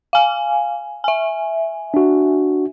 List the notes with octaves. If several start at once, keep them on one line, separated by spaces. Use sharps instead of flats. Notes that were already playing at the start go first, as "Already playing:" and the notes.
F5 G#5
E5 G#5
D4 F#4